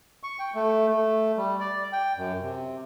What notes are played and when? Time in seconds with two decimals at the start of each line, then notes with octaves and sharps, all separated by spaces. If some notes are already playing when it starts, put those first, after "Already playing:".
0.23 C#6
0.39 G5
0.55 A3
0.88 A3
1.37 G3
1.60 D5
1.93 G5
2.17 F#2
2.42 C3